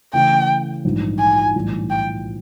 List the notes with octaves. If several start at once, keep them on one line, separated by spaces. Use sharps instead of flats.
C#3 E3 A3 G5
A#1 G#2 E3 G3
G#5
B1 A2 E3 G3
G5